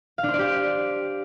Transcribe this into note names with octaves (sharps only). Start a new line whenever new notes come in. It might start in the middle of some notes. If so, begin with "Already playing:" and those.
F5
D4
C5
D5
G4